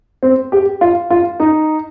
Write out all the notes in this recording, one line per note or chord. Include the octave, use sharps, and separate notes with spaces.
C4
G4
F4
F4
D#4